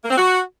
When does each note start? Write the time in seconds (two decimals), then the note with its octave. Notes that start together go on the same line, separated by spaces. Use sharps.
0.03 A#3
0.10 C4
0.17 F#4